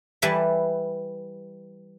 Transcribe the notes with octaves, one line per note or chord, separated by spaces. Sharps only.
E3 G3 B4 G#5 A5 B5